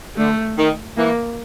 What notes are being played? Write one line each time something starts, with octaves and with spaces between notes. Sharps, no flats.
D3 A3
D#3
E3 A#3